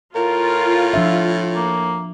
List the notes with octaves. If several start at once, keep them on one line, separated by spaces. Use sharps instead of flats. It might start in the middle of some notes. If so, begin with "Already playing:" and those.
A2 F4 A#4
F3 D4 E5
A#3